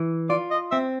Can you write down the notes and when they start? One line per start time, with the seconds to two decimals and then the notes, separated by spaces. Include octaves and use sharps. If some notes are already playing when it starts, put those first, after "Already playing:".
Already playing: E3
0.30 F4 D5
0.51 D#5
0.71 C4 E5